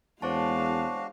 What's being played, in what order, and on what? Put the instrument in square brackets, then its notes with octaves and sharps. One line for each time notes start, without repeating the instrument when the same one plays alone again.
[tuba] E2 [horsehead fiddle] G#3 F5 [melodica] D4 F#4 [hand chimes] C5 C#5 A5